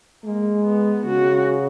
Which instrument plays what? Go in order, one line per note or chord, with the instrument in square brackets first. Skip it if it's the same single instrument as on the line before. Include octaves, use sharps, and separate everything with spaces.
[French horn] G#3 [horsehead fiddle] A#3
[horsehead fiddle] B3
[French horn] C#3 [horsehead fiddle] F#4